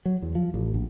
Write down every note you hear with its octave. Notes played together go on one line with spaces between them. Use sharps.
F#3
E2
F3
A1
A#1